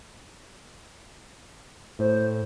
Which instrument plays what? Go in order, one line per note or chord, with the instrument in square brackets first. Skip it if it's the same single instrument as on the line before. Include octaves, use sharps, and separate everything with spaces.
[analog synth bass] A2 [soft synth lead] C5